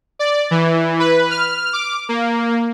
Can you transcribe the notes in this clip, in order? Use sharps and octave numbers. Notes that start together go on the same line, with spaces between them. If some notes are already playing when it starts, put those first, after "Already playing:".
D5
E3
B4
F6
D6
A#3